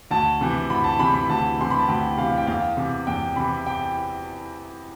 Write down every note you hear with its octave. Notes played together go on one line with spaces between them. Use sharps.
D2 A5
C3 E3
D2 B5
A5
C3 E3 B5
B5
D2 A5
C3 E3 C6
B5
A5
D2 G5
C3 E3 F5
G5
E2 F5
C3 E3
E2 G5
C3 E3 B5
G5